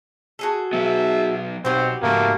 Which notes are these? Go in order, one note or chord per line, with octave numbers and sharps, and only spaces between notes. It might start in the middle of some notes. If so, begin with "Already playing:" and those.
F#4 G#4 A4
F#3 B3 E5
B1 C4 F#4 G4 B4 C5
G#2 C#3 A3 A#3